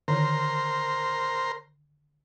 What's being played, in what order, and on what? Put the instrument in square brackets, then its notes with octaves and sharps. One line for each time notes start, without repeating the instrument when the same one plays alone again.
[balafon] D3 D#3 [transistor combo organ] A#4 C5